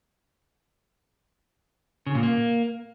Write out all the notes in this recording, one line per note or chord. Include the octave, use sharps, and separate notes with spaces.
C#3
A#2
A#3